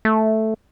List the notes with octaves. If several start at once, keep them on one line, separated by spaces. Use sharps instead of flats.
A3